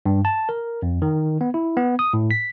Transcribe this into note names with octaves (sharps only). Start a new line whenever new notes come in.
G2
A5
A#4
F2
D#3
B3
E4
B3
D#6
A2
B6